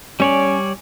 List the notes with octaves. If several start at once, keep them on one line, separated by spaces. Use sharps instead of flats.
G3 C#4 C#5 D5